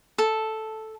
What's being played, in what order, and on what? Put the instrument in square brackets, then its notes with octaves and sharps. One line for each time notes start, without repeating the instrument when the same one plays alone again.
[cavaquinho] A4